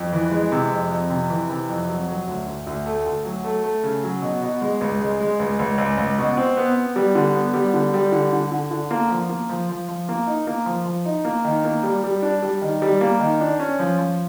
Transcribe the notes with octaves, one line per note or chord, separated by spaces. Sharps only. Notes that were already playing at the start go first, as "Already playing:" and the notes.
Already playing: F2
E3
G#3
C3
F2
F2
C3
E3
C3
F2
F#3
F#3
D2
D2
D2
A3
D2
F#3
A3
A3
C#3
F#3
B2
B2
G#3
C#2
G#3
G#3
C#2
C#2
C#2
C#2
B2
C4
B3
B3
G3
D3
B3
G3
D3
G3
D3
D3
D3
D3
A#3
F3
A#3
F3
F3
F3
A#3
D#4
A#3
F3
F3
D#4
A#3
D#3
A#3
G3
G3
D4
G3
D#3
G3
A#3
D#3
D4
C#4
F3
F3